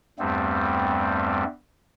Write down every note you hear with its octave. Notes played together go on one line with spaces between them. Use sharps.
E2 G2 G3 A3 B3 C4